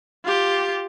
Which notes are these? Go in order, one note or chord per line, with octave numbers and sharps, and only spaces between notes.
F4 G4